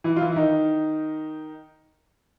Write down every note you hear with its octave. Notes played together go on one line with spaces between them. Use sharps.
E3 E4
F4
E3 E4
E4
D#3 D#4